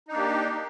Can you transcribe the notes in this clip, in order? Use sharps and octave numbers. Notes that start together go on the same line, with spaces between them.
A#3 D4 D#4 G4